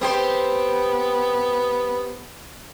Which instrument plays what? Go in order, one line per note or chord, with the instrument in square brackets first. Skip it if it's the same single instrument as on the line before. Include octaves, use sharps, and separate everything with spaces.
[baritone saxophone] B3 [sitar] C4 G4 C5